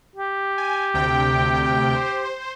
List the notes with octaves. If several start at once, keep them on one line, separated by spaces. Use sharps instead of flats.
G4
G#5
D2 C3 G5
C5